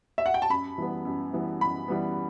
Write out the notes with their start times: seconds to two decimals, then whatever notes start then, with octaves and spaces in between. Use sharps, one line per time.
0.18 E5
0.26 F#5
0.34 G5
0.42 A5
0.50 F#2 B5
0.78 E3 G3 B3
1.05 F#2
1.33 E3 G3 B3
1.61 F#2 B5
1.88 E3 G3 B3